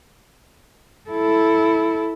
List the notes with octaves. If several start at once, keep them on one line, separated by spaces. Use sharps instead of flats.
E4 A4